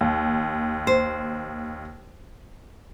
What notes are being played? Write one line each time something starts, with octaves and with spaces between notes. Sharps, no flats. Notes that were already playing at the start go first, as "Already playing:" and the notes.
D#2
C5